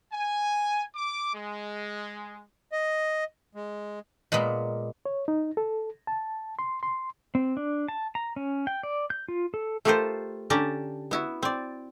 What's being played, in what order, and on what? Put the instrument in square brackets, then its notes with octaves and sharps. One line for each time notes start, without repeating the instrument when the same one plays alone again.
[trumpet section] G#5
D6
G#3
[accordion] D#5
G#3
[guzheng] A#2 G#3 A#3 B3
[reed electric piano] C#5
D#4
A4
A5
C6
C6
[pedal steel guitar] C4
D4
A5
A#5
C#4
G5
D5
G6
F4
A4
[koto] A3 F4 G4 A4 A#4 C5
D3 C#4 G4 D5 A5 A#5
B3 E4 F#4
C4 D5